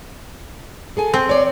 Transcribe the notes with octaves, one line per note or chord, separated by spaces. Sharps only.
G#4 A4 G#5
C4
C#5 D5